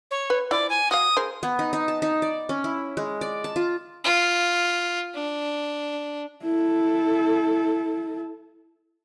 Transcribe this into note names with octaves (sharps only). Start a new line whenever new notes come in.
C#5
B4
F3 E4 D5
G#5
F#4 F5 D#6
G#4 A#4 C5
B3
D#4
D#4
A5
D#4
D5
C#4
E4
G#3
D5
A5
F4
F4
D4
E4 A4